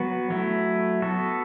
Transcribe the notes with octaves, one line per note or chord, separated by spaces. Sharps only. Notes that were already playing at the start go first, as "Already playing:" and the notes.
Already playing: F#3 B3 F#4 B4
F#3 A3 E4
B3 F#4 A4